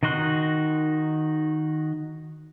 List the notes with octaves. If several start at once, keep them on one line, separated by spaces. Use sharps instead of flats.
D#3 D#4 F#4 C6 F#6